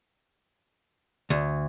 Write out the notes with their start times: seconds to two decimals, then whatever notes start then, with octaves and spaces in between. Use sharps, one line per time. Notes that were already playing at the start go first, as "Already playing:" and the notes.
1.30 D2